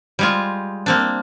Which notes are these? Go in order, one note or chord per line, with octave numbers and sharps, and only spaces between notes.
G3 G#3 F4
A#3 C4 D4